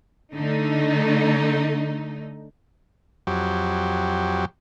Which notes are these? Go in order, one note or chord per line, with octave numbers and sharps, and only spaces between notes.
D3 A3 D#4
F2 F#3 G4